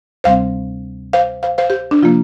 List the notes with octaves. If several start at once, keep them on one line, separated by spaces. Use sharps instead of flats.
D2 C3 G3 C4 C5 F5
C5 F5
C5 F5
C5 F5
G4 C5
D4
C3 F3 A#3 F4